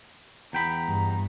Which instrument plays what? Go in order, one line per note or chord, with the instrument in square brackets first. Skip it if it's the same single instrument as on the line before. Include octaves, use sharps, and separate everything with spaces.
[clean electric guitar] E2 G5 B5 [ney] A#5
[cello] G2